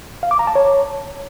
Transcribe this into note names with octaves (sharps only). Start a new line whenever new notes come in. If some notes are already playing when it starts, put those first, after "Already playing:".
F5
D6
A#5
A5
C#5